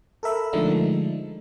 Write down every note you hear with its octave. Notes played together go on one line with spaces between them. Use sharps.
A4 A#4 E5 B5
D3 F3 G#3 A3 D4 D#4